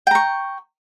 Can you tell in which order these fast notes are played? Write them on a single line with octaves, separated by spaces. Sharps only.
G5 A#5 C#6